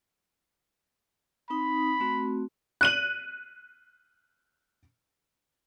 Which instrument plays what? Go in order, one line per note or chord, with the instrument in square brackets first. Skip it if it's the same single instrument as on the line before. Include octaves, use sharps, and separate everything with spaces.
[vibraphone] C4 D#4 D#6 [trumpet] B5
[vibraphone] A3 C4 F#4
[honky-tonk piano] F#6 D#7 F#7